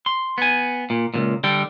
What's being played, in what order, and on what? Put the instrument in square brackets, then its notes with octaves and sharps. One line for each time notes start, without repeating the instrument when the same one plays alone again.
[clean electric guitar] C6
B3 G#5
A#2
C#2 F#2 A#2
D3 G3 G5